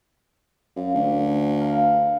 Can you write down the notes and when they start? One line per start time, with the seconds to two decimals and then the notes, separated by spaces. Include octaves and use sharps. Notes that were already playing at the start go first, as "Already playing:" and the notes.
0.76 F#2 F5
0.94 D2
1.60 A#4 F5